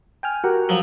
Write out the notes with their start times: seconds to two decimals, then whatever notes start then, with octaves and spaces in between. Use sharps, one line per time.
0.23 G5 G#5 F6
0.44 F#4 G4 A#4 F#5
0.69 F3 F#3